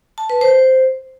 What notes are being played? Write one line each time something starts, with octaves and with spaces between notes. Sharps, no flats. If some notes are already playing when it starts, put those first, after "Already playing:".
A5
B4
C5